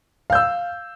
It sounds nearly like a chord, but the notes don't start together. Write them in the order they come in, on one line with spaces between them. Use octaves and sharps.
F5 G6 E6